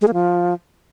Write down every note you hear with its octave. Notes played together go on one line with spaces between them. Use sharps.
G#3
A#3
F3